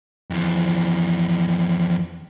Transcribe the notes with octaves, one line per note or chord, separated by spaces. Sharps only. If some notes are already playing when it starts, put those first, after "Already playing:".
F2 E3